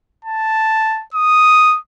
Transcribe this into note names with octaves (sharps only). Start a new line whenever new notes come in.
A5
D#6